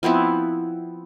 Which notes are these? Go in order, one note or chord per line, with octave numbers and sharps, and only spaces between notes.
F3 B3 C4 E4